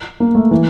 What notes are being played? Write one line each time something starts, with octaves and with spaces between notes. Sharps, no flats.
A#3
A3
E3